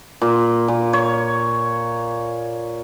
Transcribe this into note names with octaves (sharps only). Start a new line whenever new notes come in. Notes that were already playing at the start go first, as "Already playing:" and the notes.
A#2
A#2
C#5